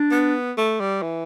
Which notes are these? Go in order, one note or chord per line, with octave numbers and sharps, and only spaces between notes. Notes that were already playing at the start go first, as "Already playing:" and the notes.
Already playing: D4
B3
A3
G3
E3